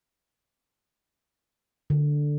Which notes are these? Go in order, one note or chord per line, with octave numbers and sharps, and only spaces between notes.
D3